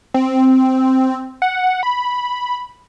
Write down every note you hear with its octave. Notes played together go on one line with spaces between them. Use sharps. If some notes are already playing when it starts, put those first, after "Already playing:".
C4
F#5
B5